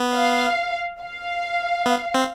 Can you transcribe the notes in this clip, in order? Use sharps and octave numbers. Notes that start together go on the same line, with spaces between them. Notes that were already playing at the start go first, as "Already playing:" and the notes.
Already playing: B3
F5
F5
B3
C4